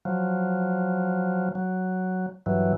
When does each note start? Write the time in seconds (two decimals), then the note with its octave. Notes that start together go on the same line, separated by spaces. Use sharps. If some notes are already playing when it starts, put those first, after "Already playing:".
0.05 F3 F#3
1.55 F#3
2.46 G2 E3 F#3